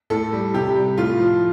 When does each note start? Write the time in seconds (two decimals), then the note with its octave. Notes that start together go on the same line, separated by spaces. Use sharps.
0.10 A2 A4
0.32 G3
0.54 C3 G4
0.76 G3
0.98 A2 F4
1.20 F3